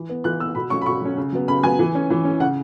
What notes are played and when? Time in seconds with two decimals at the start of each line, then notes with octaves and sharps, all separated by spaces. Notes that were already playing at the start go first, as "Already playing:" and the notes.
Already playing: E3
0.09 B3
0.24 E3 F#6
0.40 B3 E6
0.55 B2 B5
0.70 F#3 C#4 C#6
0.81 B5
0.86 B2 C#6
1.01 F#3 C#4
1.18 C#3
1.32 F#3 B3
1.48 C#3 B5
1.63 F#3 B3 G#5
1.79 E3
1.95 C#4
2.10 E3
2.25 C#4
2.40 C#3 F#5